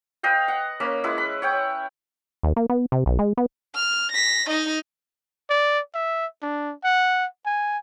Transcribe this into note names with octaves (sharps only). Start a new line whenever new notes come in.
B4 D#5 F5 G5
F#5
A#3 C#4 B5
G#3 E4 B4 F#5
B5
C#5 F#5 G5
D#2
A#3
B3
C3
B1
G#3
B3
F6
A#6 B6
D#4 D#5
D5
E5
D4
F#5
G#5